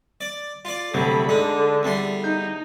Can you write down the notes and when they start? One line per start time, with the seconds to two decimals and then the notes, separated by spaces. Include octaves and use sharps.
0.21 D5
0.65 F4 D5
0.94 G1 C3 F#3 A3 A4 B5
1.29 D3 G#3 D#4
1.83 E2 G3 C6
2.24 D#4 G6